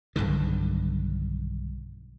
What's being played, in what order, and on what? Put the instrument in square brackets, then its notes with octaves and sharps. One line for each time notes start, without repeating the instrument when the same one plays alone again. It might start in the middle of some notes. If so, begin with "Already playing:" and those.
[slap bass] B1 G2 D3 D#3